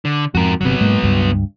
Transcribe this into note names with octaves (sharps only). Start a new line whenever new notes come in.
D3
F2 G#2 F#4 A#4
G1 C3 F#3 B3
G#2 G#3 A#3
C#2 G2